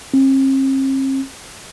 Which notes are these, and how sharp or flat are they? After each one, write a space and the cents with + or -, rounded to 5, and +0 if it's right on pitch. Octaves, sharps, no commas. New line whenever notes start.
C4 +45